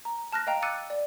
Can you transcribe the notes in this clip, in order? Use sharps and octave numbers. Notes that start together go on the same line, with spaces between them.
A#5
A5 F6 F#6 A#6
D#5 F5 G5 A#5
D6 E6 F#6 A6 C#7 D#7
D5